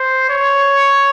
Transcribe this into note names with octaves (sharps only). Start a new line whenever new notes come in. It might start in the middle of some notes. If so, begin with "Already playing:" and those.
Already playing: C5
C#5